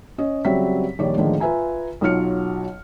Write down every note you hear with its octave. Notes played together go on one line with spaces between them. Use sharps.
C#4 D#5
C#3 F#3 G3 C4 E5 B6
A#1 D#3 G3 C#5 D5
A2 D3 D#3 F3 G#3 A#3
F4 B4 E5 G#5 A#5
B1 F#3 F4 F6 C#7